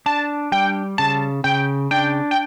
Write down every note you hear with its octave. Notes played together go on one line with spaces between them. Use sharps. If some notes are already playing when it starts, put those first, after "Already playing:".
D4 A5
G3 G5
C#3 A5
C#3 G5
D4 G5
G5